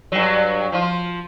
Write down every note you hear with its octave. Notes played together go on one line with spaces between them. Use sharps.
G2 F#3
F3 F4